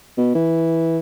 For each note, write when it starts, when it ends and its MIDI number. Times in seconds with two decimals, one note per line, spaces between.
0.17 0.32 47
0.35 0.99 52